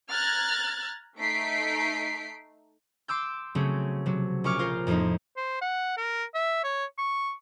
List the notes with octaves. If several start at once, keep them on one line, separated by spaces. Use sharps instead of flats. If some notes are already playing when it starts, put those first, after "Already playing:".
A#5 F6 F#6 G#6 A6
A3 D#4 B6 C7 D7
C6 D6 E6 G6
C#3 F#3 A3 C4 C#4
C3 F#3
A#1 C#4 C#6 D6 F6
F4 A#4 C5
F2 A2 F3 A#3 D#4
C5
F#5
A#4
E5
C#5
C#6